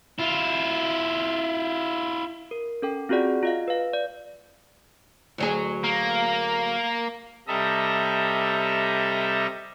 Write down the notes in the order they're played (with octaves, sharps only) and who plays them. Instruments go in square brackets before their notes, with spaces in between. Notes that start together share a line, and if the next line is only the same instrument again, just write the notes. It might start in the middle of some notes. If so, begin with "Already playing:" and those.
[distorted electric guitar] E4 F4
[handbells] A#4
C#4 A4 G5
C4 F4 F#4 G#4 D5 F#5
F4 D#5 F5
B4 F5
D5
[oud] D2 F#3 G#4
[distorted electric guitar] A#3
[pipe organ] C3 G3 A4 D#5 E5 A#5